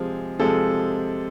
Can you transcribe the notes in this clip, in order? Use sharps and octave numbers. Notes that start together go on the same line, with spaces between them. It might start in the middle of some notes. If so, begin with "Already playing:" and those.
Already playing: C3 F3 G#3 G#4
C3 F3 G#3 A4